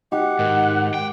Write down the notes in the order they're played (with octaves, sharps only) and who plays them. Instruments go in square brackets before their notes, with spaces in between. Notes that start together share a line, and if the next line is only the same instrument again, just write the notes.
[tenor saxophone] D#4 [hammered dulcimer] G4 [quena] F#5
[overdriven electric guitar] G#2 [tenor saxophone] D#3
[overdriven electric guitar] G5